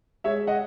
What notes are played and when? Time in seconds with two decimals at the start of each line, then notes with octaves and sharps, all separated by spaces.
0.24 G#3 C#5 E5
0.47 D#5 F#5